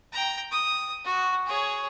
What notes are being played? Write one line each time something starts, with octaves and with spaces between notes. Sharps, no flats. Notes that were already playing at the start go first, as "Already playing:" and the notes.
G5 A#5
D#6
F#4
G#4 C#5